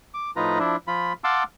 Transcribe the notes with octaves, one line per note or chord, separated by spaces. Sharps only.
D6
A2 F3 D#4 F4 B4 A#5
F3 D4 E4
F3 F4 B5
F5 F#5 A5 C6 D6 E6